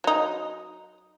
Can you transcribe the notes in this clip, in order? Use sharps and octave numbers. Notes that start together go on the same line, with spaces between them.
F#3 D#4